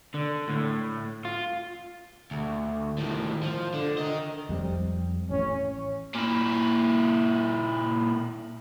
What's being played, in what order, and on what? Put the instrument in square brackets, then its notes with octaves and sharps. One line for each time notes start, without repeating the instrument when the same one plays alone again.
[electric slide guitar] D3
A2
F4
[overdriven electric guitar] D2
A2 D#3
F3
D3
A#4 D#5
[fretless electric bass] F2 G3 C4
[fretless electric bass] A1 [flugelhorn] C#4
[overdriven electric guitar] A#2 E4